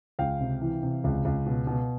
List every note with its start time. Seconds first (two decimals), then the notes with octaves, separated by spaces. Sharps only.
0.19 C#2 F5 G5
0.40 C3
0.62 E3
0.83 C3
1.04 C#2
1.25 C#2
1.46 B2
1.67 B2